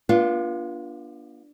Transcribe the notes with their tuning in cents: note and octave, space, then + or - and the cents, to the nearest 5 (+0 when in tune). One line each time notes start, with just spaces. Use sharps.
B3 -45 D4 +0 F4 -10